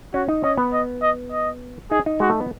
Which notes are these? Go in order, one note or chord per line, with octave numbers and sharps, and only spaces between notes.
C#4 F#4
D#4
C#4 D#5
B3
D#5
D#5
D#5
D#4 G#4
D#4
G#3 F#4
A3
B3